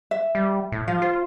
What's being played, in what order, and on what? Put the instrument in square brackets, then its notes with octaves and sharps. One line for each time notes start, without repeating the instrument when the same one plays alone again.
[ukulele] E5
[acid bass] G3
A2
[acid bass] F3 [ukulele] F4
[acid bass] F4 [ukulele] C5